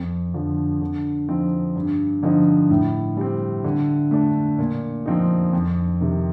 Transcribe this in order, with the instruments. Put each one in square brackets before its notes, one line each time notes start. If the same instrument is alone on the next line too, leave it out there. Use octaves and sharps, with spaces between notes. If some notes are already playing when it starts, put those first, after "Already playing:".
Already playing: [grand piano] F2
D3 F3
D3
F3 C4 D#4
G2
D3 F3 C4 D#4
A2
G3 C4
D3
A3 D4
A#2
F3 C4 D#4
F2
C3 D#3